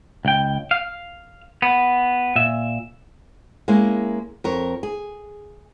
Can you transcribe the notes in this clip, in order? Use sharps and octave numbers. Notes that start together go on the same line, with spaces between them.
C#2 G5
F5
B3
A#2 E5
G#3 A#3 C#4 E4 F5
F2 A#4 C#5
G#4